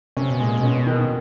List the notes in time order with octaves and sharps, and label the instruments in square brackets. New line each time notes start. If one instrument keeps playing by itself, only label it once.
[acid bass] C3 [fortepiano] C#4
[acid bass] B2
[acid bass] A#2 [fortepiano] G#3
[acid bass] B2
[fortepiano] C#4
D#3